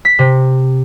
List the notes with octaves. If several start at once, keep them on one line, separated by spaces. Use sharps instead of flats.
B6
C3